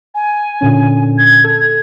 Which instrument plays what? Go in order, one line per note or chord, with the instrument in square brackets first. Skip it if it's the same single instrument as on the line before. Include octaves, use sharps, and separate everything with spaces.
[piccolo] G#5
[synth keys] A#2 D3 C#4
[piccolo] G#6
[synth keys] A4